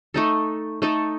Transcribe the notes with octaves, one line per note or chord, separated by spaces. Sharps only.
A3 D#4 A4
A3 D#4 A4